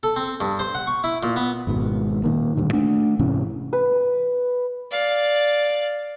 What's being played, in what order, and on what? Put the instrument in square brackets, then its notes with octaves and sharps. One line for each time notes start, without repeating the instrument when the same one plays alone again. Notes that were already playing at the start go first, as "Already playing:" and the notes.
[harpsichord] A4
C4
G2
C5
F#5
C#6
E4
A#2
B3
[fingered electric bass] G#1 G#2 B2
A#2 D#3 A#3
D2 G2 A#2 D#3
A3 D4
G#2 C3 E3 C#4
[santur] B4
[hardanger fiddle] D5 F5